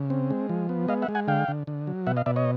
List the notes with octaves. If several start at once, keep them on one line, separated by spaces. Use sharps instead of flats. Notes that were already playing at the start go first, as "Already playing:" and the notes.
Already playing: C#3
C4
G#3
F3
B3
G#3 D#5 F5
E5 F#5
G#3
F#5 G#5
D3 F5 G5
D3
D3
F#3
B2 E5 F#5
D#5 F5
B2 D5 E5
C#5 D#5